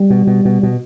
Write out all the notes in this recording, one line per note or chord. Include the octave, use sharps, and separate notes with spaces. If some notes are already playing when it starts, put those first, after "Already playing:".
Already playing: G3
B2
B2
B2
B2